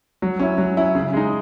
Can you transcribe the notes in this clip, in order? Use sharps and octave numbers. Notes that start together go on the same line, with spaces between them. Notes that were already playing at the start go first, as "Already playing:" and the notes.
F#3
C#4 E4
F#3
C#4 E4
C#3
G#3 D#4